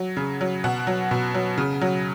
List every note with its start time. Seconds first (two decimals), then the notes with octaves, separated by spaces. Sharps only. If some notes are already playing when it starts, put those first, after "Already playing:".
Already playing: F#3
0.17 C#3
0.41 F#3
0.64 B2 F#5
0.87 F#3
1.11 B2
1.34 F#3
1.58 C#3
1.81 F#3